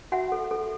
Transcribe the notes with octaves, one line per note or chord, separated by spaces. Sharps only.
F#4 E5 F#5
A4
A4